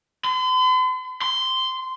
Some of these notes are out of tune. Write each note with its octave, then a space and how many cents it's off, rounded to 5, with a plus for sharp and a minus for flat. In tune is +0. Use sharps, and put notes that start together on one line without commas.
C6 -45
C6 -10